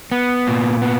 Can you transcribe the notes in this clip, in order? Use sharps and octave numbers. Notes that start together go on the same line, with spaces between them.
B3
A#2
B3